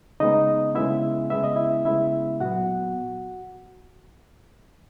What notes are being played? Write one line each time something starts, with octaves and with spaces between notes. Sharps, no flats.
C#3 G#3 B3 D#4 D#5
C#3 G#3 B3 E4 E5
C#3 G#3 B3 E5
D#5
E4 E5
C#3 G#3 B3 E4 E5
A#2 F#3 B3 F#4 F#5